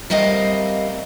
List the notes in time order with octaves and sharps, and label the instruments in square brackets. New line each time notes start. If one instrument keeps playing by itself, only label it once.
[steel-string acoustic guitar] G3 A3 C4 A#4 D#5 F5